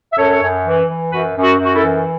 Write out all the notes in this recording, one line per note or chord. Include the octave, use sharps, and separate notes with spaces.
E5
F#2 A4 C#5
F#2
E3
E3
F#2 F#4 B4
F#2
F#4
F#2
F#4
E4 A4
E3